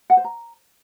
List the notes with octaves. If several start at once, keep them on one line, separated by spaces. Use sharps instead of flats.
F#5
C5
A#5